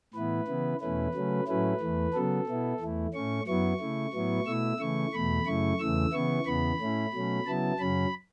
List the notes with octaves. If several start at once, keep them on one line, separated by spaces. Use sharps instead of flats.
A2 E3 B3 E4 B4
C#3 E3 B3 E4
E2 B2 A3 C#4 E4 B4
C#3 F#3 A3 C#4
A2 F#3 A3 C#4 E4 B4
E2 E3 A3
C#3 F#3 B3 A4
B2 B3 E4
E2 E3 A3 E4
A2 A3 C#4 C#6
F#2 F#3 B3 E4 C#6
C#3 A3 E4
A2 F#3 B3 E4
B2 A3 E4 E6
C#3 E3 A3 E4 C#6
E2 B2 A3 B5
F#2 C#3 A3 E4 C#6
E2 C#3 E3 A3 E6
C#3 E3 B3 E4 C#6
E2 C#3 E3 B3 B5
A2 A3 C#4 E4
B2 F#3 A3 C#4
C#3 F#3 B3 E4 A5
F#2 C#3 F#3 C#4 B5